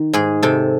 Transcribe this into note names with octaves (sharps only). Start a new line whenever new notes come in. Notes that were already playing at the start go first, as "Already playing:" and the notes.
Already playing: D#3
G#2 G#4
C3 A4